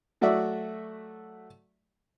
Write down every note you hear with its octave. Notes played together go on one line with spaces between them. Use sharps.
F#3 A3 F#4 D5 E5